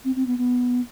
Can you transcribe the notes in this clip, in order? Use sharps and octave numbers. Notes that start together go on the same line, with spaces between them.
C4
C4
B3
B3